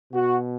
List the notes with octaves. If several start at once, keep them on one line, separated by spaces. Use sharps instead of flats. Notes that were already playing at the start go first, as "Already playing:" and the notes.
B2 F#4